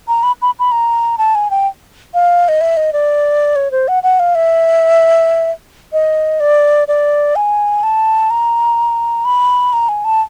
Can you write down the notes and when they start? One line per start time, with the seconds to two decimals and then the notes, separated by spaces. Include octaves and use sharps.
0.08 A#5
0.23 B5
0.42 B5
0.59 B5
0.72 A#5
1.18 A5
1.35 G#5
1.51 G5
2.14 F5
2.48 D#5
2.61 E5
2.77 D#5
2.93 D5
3.56 C#5
3.71 C5
3.88 F#5
4.03 F#5
4.20 F5
4.35 E5
5.93 D#5
6.40 D5
6.88 D5
7.36 G#5
7.83 A5
8.30 A#5
9.25 B5
9.73 A#5
9.89 G#5
10.05 A5